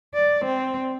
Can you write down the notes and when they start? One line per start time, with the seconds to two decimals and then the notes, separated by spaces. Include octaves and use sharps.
0.14 D5
0.46 C4